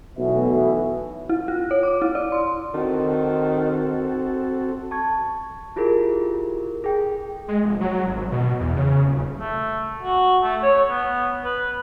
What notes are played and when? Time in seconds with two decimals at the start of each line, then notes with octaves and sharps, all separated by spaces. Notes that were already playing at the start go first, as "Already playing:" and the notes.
0.17 B1 B2 E3 A3 E5
1.29 E4
1.48 F4
1.71 C#5
1.83 D6
2.02 E4
2.15 D5
2.32 C6
2.74 D#3 C4 F#4 A4
4.91 A5 C#6 G#6
5.76 E4 F4 G4 G#4 A#4
6.84 G#4 A4 G5
7.48 G#3
7.64 F1
7.81 F#3
8.07 G#1
8.32 B2
8.60 E2
8.76 C#3
9.06 D#1
9.39 A3
10.03 F#4
10.42 A3
10.63 C#5
10.90 B3
11.44 B4